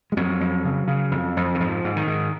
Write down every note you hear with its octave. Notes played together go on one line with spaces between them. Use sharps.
G#3
F2 F#3
F2
C#3
C#3
F2
F2
D#3
G#2 F3
G#2
D#3
G#2